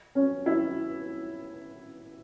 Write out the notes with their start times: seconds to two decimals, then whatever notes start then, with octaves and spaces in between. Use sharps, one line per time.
0.15 C#4
0.46 E4